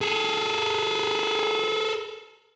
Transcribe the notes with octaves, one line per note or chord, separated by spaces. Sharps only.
G#4 A4